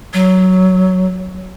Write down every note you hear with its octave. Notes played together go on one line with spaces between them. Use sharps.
F#3